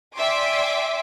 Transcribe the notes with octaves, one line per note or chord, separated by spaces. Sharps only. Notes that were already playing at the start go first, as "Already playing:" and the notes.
D5 E5 G5 G#5 C6 D6